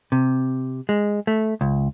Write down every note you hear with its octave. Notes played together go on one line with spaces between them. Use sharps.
C3
G#3
A3
C#2